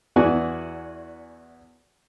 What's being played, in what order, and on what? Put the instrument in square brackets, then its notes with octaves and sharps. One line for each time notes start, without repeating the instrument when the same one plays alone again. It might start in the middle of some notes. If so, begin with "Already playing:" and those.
[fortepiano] E2 E3 B3 F#4 D5 G#5